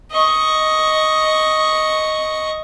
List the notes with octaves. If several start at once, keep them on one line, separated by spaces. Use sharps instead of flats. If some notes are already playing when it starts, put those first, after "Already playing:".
D#5 C#6